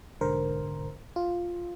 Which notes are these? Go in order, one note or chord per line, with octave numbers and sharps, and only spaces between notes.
B1 G#2 D3 A#4 C5
F4